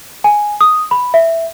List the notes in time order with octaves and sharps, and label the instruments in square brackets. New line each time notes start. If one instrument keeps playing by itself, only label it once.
[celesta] G#5
D#6
B5
E5